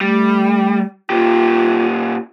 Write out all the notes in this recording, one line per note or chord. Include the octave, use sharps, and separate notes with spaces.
G3 A3
A#2 F4 G4